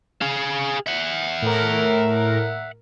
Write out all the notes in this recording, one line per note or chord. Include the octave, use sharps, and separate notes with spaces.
G#4 F5
E5 F#5
A2 A#4